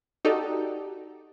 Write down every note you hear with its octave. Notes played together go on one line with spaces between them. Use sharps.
D#4 F#4 G4 A4 D5